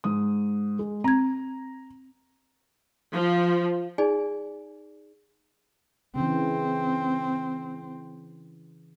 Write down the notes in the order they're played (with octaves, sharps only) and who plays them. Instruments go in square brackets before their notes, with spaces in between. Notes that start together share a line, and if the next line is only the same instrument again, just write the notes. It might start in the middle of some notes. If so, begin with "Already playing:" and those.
[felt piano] G#2 D#6
G#3
[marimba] C4 G#6 [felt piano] A#5
[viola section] F3
[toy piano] D#4 G#4 D5 G#5
[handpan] C#3 E3 [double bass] C4